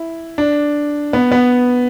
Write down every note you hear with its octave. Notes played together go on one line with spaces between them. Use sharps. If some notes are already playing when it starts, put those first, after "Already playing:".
Already playing: E4
D4
B3
B3